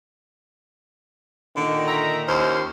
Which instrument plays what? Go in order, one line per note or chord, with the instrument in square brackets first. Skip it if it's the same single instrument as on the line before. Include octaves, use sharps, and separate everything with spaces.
[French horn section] A#2 D#3 [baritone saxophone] D3
[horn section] E5 A#5
[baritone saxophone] D#2 [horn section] C#4 E4 C5